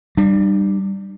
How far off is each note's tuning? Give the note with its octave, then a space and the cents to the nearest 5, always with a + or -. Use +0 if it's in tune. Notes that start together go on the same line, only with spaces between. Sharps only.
G3 +0 D4 +45